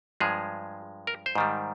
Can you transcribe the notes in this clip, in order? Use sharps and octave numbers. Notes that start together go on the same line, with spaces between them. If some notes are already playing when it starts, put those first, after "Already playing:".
G2 F3 G#3 G#4
A#4
C5
G#2 D#3 G3